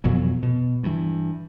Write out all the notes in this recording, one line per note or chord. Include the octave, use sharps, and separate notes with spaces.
F2 B2 E3 F#3
B2
G2 E3